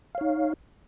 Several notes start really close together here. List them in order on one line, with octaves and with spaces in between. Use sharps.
F5 C#5 D#4